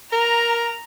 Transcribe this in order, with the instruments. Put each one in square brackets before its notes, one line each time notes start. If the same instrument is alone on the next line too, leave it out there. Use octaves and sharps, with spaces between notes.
[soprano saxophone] A#4 [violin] A#5